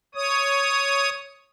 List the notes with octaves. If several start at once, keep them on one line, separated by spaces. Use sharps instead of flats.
C#5 D#6